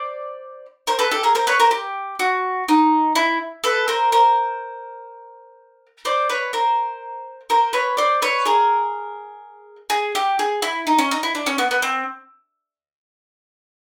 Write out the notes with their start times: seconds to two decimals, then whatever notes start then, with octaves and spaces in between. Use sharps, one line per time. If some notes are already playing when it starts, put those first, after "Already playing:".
Already playing: C5 D5
0.87 A#4 C5
0.99 A4 B4
1.11 G4 A4
1.23 G#4 A#4
1.35 A#4 C5
1.47 B4 C#5
1.60 A#4 C5
1.71 G4
2.19 F#4
2.68 D#4
3.15 E4
3.64 A4 B4
3.88 A#4 C5
4.12 A#4 C5
6.05 C5 D5
6.29 B4 C#5
6.53 A#4 C5
7.50 A#4 C5
7.73 B4 C#5
7.97 C5 D5
8.22 B4 C#5
8.45 G#4 A#4
9.90 G#4
10.15 G4
10.39 G#4
10.62 E4
10.87 D#4
10.99 C#4
11.11 D#4
11.23 E4
11.35 D4
11.46 C#4
11.58 B3
11.71 B3
11.82 C4